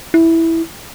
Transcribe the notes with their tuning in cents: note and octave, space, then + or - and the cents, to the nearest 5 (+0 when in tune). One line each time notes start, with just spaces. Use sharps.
E4 -5